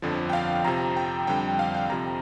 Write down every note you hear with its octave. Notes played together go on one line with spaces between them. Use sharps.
G1 F2 D3 F3
G5
F5
F2 C3 F3 A#5
G5
F2 D3 G3 G5
F5
G5
F2 C3 F3 A#5